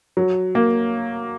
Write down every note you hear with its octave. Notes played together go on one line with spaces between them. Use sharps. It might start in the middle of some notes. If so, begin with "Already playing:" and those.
F#3
A#3